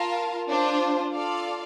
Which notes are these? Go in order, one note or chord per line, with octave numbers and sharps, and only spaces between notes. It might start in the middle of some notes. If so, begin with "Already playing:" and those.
Already playing: F4 A#4 F5 A5
D4 F4 C5
F4 A4 D5 F5